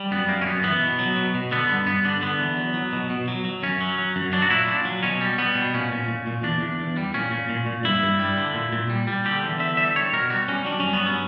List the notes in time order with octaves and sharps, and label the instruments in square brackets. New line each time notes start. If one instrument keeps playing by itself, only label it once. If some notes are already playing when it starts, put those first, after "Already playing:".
Already playing: [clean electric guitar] G3
F#2 B3
F#2 A#3
C#4
F#2 B3
E3 B3
B2
F#3
B2
B2
D3 B3
G2 B3
G2 B3
D3 D4
D3 B3
E2
F#3
F#3
B2
B2
F#3
F#3
F#2 C#4
F#3
F#3
F#2
F#3 D4
F#4
A#2 E4
A#2 D4
F#3
B2 C#4
G3
G3 B3
B2
A#2 C#4
A#2
A#2
A#2
E2 D4
E2
E2
G3
A#2 C#4
A#2
A#2
A#2
G2 E4
G2
G3
D3
A#2
A#2
G3
G3
D3 G4
E2
D3 E5
G3 E5
G3 C#5
B2 A#4
G3 F#4
G3 C#4
F#3 D4
G2 C#4
B3
F#3 C#4